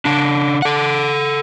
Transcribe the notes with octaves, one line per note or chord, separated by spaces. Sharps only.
C#3 D4
A4 F#5